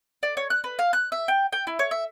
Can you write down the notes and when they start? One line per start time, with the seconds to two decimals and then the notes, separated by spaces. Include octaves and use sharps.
0.23 D5
0.37 C#5
0.50 F#6
0.64 B4
0.79 F5
0.93 F#6
1.12 E5
1.28 G5
1.53 G5
1.67 E4
1.79 C#5
1.91 E5